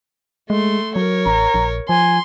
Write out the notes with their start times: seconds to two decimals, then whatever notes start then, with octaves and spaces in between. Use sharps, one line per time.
0.50 G#3 A3 C6
0.96 F#3 A#4 C#5
1.26 A1 A#5
1.54 A#1
1.89 F3 G#5 C6